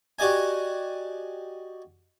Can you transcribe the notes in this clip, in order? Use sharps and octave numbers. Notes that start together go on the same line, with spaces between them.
F#4 G4 D5 D#5 G#5